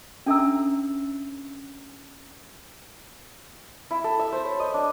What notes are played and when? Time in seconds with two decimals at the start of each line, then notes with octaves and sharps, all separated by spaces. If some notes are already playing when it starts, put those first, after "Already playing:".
0.26 C#4 D4 A4 E5 A#5 E6
3.91 E4
4.04 A4
4.19 E5
4.32 C5
4.45 C#5
4.60 D#5
4.74 D4